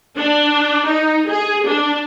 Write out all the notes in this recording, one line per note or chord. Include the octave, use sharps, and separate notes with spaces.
D4
D#4
G#4
D4